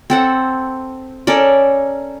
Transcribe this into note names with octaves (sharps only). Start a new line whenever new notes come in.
C4 A4 F#5
C#4 A4 A#4 D5